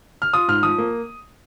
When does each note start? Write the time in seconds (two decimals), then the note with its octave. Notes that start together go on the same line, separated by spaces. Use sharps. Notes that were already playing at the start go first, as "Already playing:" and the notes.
0.22 F6
0.33 F4 D#6
0.48 G#2 F6
0.63 F3 D#6
0.78 A#3